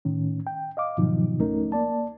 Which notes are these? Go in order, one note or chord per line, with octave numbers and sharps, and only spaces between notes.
A2 D#3 C#4
G5
D#5 F5 D6
G#2 B2 D#3 F3 F#3 D#4
C#2 A3 C#4 D#4 A#4
A#3 D5 A5